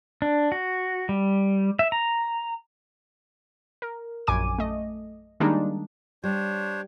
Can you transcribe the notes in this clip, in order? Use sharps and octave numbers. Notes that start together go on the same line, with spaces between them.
D4
F#4
G3
E5
A#5
A#4
A#1 F#2 G#5 D6 D#7
A3 D#5
D#3 G3 G#3 A#3 D4 D#4
G3 D4 C5 C#5